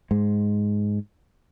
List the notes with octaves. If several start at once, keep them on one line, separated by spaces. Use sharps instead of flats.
G#2 G#3